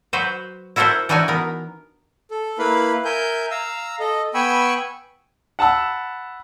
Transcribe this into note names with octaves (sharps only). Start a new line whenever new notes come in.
F#3 F#4 B4 C5
E4 F#4 A4 A#4 C5 E5
E3 D4 D#4 F#4 C#5 G#5
B3 A#4
A4
A#3 E4 B4 F5 B5
A#4 E5 G#5 G6
F5 A#5 E6
A4 D#5
B3 G5 G#5 B5 C#6 E6
F#5 A5 B5 E6